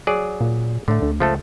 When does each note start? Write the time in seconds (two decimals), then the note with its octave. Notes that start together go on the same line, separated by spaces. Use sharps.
0.07 F#3 G#4 D5
0.41 A#2
0.88 A2 D3 A3
1.02 D2
1.20 C#2 F3 A3 A4